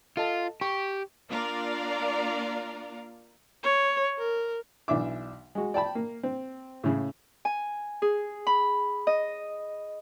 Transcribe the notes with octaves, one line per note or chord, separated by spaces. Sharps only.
F4 A4 D#5 A5
G4 C#6
A#3 D4 F4 A#4 D5 F5
C#5
A#4
B1 E3 D4 E5 D6
G#3 F#4
D5 G5 A5 B5
A#3
C4
A2 C#3
G#5
G#4
B5
D#5